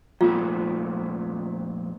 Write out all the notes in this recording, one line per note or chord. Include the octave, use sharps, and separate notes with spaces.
F2 A#2 A3 F4